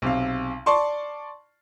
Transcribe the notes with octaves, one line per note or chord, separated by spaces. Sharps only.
B1 C3 F5
D5 A5 C6 C#6